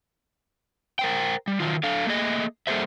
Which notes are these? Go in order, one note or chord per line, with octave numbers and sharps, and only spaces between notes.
A#4 C5 G5
G3
D#3 F#3 F4
D4 A4 F5
A3 A#3 G#4 D#5
G3 A#3 G#4 A4 C5 E5